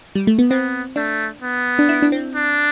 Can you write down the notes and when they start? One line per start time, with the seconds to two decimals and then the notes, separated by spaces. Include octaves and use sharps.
0.15 G3
0.27 A3
0.39 B3
0.50 B3 C4
0.96 A3 D4
1.42 B3
1.79 D4
1.89 E4
2.02 D4
2.12 C4
2.35 D4